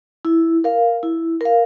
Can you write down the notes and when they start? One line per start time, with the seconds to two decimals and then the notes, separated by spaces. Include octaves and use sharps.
0.25 E4
0.64 A#4 F5
1.03 E4
1.41 A#4 F5